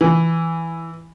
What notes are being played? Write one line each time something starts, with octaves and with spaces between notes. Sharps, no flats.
E3